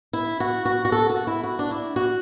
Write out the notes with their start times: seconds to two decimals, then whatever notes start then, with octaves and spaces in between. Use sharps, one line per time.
0.13 E4
0.40 F#4
0.65 F#4
0.85 F#4
0.92 A4
1.10 F#4
1.27 E4
1.44 F#4
1.59 D4
1.71 E4
1.96 F#4